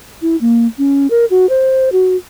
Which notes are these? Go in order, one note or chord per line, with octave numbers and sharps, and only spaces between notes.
E4
A#3
C#4
A#4
F#4
C5
F#4